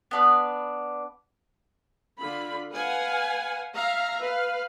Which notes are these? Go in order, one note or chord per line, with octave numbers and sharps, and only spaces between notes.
B3 D4 B4
D3 F4 B5
B4 F5 F#5 G#5
E5 F5 A#5
B4 F5